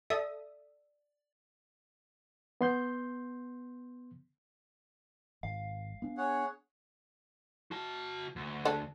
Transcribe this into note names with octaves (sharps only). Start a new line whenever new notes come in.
A4 D5 E5 D#6
B3 C6 G6
G#1 F5
B3 D4
G#4 C#5 F#5
F#4 A5
D2
D4 A4